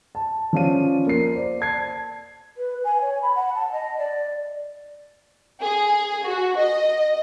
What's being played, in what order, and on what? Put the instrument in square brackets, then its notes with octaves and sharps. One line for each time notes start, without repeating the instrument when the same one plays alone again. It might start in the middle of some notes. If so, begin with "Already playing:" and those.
[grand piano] A5
F3 C#4 F4 D5 F5 D#7
A#3 C7
C5 D5
A5 G#6 C7
[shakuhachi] B4
G#5
C#5
B5
F#5
A5
D#5
D5
[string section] G#4
F#4
D#5